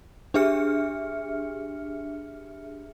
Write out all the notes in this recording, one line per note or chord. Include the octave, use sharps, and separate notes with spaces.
D4 G4 G#4 E5 F6 C#7